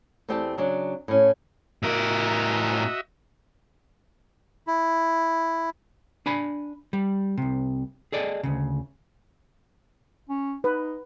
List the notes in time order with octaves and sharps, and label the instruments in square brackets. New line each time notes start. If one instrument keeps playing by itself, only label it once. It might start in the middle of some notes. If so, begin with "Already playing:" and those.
[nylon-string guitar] E2 A3 C4 G4 D5 A5
C#3 F#3 D4
A2 C#4
[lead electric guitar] A2 A#4 [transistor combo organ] F#4 D#5 E5
[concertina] E4
[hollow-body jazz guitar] D4 G#5 B5
G3
C2 C3
G#4 A4 D5 D#5
D2 C#3
[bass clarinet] C#4
[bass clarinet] D#4 [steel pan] B4